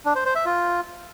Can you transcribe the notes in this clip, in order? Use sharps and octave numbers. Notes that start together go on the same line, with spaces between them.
D4
C5
C5
E5
F4